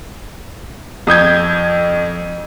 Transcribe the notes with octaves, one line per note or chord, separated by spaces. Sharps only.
F2 D#6 G6 G#6